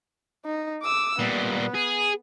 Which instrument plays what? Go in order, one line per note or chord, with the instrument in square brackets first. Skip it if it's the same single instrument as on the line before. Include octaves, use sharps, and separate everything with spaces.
[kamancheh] D#4
D6 E6
[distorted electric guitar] A#2 G3 [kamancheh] B3
[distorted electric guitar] G#4